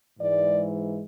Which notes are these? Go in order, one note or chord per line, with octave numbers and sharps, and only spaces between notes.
G#2 E3 G#3 D5